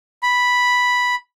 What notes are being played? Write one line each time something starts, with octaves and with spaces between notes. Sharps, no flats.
B5